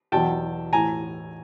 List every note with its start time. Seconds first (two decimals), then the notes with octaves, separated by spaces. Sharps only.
0.12 E2 B2 F#3 G5 A5
0.72 A2 E3 G#5 A#5